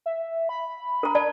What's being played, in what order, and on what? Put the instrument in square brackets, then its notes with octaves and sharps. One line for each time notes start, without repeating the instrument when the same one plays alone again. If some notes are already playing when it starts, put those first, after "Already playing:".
[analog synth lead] E5
B5
[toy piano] A#4 A#5
D5 A5